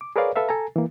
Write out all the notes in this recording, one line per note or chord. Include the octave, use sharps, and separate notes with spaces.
D6
G#4 A#4 B4 C#5 D5 F5
A4 B4 E5 F5
A4 G#5 A#5
E3 A#3